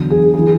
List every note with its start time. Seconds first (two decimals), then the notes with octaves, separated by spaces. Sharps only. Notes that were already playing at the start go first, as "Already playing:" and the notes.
Already playing: E2 D3 F#3
0.10 G#4
0.34 E3 G#4